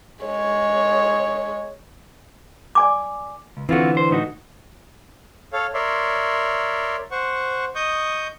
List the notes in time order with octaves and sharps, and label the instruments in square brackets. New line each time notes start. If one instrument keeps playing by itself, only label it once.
[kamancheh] G#3 C#5
[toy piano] D5 G#5 D6
[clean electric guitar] C#2
[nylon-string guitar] D3 E3 [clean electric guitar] C4 F4 F#4
[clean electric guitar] C5
A2 D#4 F#4
[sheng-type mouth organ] A4 C#5 F5
A#4 C#5 D5 E5 C6
C5 F#5 C#6
D#5 C#6 D#6 G6